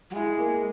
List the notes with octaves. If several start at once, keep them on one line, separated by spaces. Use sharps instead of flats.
F#3
G#3 E4
A#3